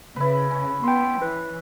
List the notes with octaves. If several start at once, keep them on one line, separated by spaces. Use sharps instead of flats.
C#3 E4 B4
C#4
B3 G5 C6
E3 B4